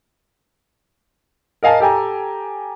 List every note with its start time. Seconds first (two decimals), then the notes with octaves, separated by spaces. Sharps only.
1.63 A#4 D#5 F5 G#5 A5
1.80 G4 A4 G5 G#5 A#5